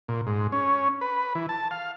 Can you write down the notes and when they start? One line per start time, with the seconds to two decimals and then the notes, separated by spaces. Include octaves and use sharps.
0.08 A#2
0.27 G#2
0.52 C#4
1.01 B4
1.35 E3
1.49 A5
1.71 F5